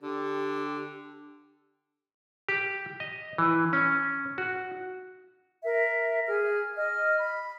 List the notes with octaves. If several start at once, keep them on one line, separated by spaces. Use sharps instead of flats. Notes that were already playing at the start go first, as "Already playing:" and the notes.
D3 G4
G4
D#5
E3
C#4
F#4
A#4 E5
G#4 F6
D#5 F6
B5